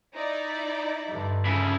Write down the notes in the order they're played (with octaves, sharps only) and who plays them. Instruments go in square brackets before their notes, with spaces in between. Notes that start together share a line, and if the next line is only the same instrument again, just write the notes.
[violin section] D#4 E4 D5
[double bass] G2 D3
[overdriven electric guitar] C#3 E4